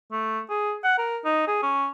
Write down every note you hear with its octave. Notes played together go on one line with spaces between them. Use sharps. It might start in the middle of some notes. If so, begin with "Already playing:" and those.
A3
G#4
F#5
A#4
D#4
G#4
C#4